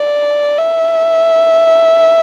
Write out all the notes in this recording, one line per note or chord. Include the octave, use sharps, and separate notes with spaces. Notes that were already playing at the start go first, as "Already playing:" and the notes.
Already playing: D5
E5